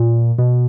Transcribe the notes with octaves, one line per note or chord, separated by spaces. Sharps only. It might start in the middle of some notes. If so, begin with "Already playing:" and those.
Already playing: A#2
B2